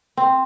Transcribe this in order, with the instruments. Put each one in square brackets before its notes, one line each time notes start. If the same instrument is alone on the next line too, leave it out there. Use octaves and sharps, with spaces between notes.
[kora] C4